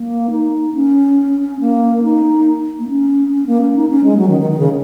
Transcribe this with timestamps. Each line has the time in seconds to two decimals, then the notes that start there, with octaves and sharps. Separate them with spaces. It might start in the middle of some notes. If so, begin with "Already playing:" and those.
Already playing: A#3
0.31 D#4
0.74 C#4
1.60 A#3
2.04 D#4
2.79 A#3
2.88 C#4
3.32 C#4
3.47 A#3
3.61 C#4
3.76 D#4
3.89 C#4
4.04 G#3
4.17 F#3
4.28 D#3
4.40 D#3
4.51 D#3
4.59 C#3